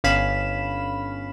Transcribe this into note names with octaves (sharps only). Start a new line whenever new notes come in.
G1 C#4 F5 B5 E7